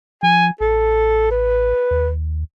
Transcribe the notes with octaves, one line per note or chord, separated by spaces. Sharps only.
F3 G#5
A1 A4
B4
D#2